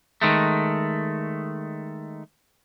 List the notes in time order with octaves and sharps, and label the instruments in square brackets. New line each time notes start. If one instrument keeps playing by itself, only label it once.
[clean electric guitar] D#3 G#3 A3